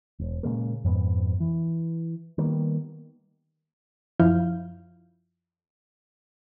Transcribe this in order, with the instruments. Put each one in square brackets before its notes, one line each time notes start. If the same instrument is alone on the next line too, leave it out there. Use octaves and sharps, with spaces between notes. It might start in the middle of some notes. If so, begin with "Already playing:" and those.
[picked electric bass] E1
A#2 C#3 G#3 A#3
F2 G#2 B3
E3
D#3 G3 A#3 B3
[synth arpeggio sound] F#2 F3 E4 F5 F6 G6